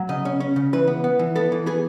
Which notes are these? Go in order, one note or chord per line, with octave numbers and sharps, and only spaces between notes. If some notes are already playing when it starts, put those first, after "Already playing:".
Already playing: F#3
C#3 D#5
C#4
C#4
C#3
E3 B4
B3
B3
E3
B3 A4
E3
B3 G#4